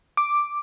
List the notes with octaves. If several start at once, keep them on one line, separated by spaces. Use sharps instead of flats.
D6